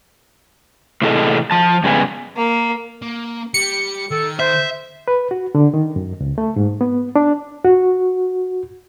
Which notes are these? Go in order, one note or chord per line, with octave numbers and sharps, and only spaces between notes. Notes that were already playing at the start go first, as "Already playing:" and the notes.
A2 C3 E3 G#4 A4 D#5
F3 A5
G2 C#3 G#3 B3 G#5
A#3
A#3
G3 C#7
D#3 A4
C5 E5
B4
F#4
D3
D#3
F#2
C#2
A3
G#2
B3
D4
F#4